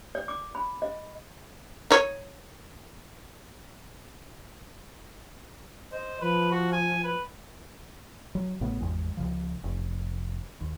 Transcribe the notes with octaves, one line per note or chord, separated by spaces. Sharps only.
D5
D6
B5
D#5
D#4 C#5
C5 D#5
F3 B4
F#4
G#5
B4
F#3
A1 A2 C#3 B3
G#1 E2 G#3
C#2 C#3 F3
F1
D#2